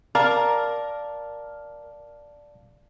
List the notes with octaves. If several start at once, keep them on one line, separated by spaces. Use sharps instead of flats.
A#4 D5 F5 A5